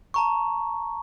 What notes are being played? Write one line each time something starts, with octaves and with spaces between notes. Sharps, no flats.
A5 A#5 C#6